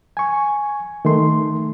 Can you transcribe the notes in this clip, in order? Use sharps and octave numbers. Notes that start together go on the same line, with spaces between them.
G#5 C#6
D#3 A3 C6